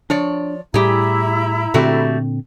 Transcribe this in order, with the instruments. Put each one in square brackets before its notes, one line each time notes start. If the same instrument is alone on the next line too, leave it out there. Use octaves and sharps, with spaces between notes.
[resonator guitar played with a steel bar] F3 C#5 D5 [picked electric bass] D4
[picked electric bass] A2 G3 [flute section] E4 A#5 [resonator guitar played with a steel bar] G4 G#4
[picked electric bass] A#2 D3 C4 [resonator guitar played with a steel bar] A3 F#4 G4